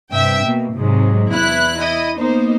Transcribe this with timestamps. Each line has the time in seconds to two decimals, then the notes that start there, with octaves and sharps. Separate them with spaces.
0.12 G2 C3 E5 G5 E6
0.43 B2 A#3
0.74 G#2 C3 F#3 G#3
1.31 E2 E4 F#6
1.79 E4 D#5
2.16 A#3 B3 D#4 C5